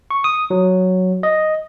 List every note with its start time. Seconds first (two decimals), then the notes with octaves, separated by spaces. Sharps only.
0.11 C#6
0.24 D#6
0.50 F#3
1.23 D#5